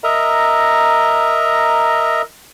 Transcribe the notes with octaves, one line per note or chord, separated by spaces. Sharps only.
A#4 D#5 E5 A#5